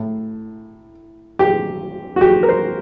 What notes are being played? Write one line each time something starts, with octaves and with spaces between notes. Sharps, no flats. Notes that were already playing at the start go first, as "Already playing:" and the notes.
Already playing: A2
G4
F#4
G4
A#4
C5